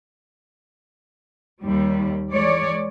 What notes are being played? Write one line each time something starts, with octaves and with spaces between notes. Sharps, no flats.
D#2 G3
E3 G#3 C#5 D5